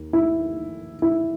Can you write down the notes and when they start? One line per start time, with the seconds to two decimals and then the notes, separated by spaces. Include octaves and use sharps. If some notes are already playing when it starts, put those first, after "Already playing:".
Already playing: D#2 D#3
0.13 E4
1.02 E4